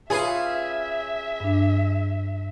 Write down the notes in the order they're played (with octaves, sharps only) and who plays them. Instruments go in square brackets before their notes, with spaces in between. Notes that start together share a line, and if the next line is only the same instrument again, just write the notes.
[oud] C#4 F4 B4 [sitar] G#4 [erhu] E5
[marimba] G2 D4